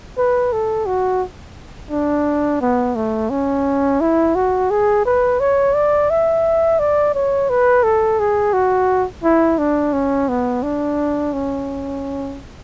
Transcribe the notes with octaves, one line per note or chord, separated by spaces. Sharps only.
B4
A4
F#4
D4
B3
A3
C#4
E4
F#4
G#4
B4
C#5
D5
E5
D5
C#5
B4
A4
G#4
F#4
E4
D4
C#4
B3
D4
C#4